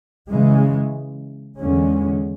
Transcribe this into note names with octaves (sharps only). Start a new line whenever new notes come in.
C#3 E3 G#3
E2 D3 G#3 C#4